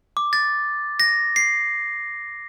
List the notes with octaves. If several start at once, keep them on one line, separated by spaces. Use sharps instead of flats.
D6
A6
A#6
C7